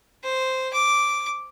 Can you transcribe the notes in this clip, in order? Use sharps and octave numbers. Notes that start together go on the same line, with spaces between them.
C5
D6